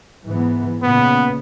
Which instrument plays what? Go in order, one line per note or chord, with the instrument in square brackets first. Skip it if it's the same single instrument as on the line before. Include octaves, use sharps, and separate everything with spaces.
[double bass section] G#2 E3 B3
[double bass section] A#2 C#3 [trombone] B3